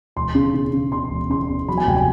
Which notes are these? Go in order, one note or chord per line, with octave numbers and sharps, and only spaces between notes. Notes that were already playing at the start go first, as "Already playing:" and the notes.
E1 C6
C#3
C#3
C#3
E2 C6
E1
C#3 C6
E2
F#3 B5
G#5
F1 G5
G#5